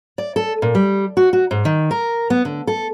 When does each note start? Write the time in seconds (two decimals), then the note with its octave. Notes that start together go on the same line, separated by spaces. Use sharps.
0.18 D5
0.36 A4
0.62 A#2
0.75 G3
1.17 F#4
1.33 F#4
1.51 G#2
1.65 D#3
1.91 A#4
2.30 B3
2.45 D3
2.67 A4